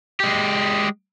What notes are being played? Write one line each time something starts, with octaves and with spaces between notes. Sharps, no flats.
G#3 G4